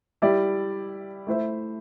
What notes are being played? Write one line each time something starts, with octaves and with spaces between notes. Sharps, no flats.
G3 E4 G4 D5
A3 E4 C5 E5